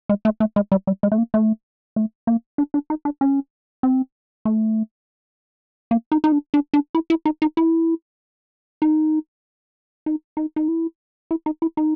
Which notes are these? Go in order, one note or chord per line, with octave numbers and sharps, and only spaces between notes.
G#3
A3
A3
G#3
G3
G3
G#3
A3
A#3
A3
A3
A#3
D4
D4
D#4
D4
C#4
C4
A3
A#3
D#4
D#4
D4
D4
D4
E4
E4
D#4
D#4
E4
D#4
D#4
D#4
D#4
E4
E4
D#4
E4
D#4